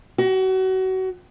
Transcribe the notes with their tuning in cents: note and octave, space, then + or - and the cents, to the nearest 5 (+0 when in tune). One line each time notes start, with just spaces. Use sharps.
F#4 +30